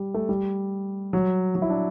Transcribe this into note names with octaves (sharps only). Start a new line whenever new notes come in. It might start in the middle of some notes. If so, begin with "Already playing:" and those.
Already playing: G3
A3
G3
F#3
F#3
E4
D4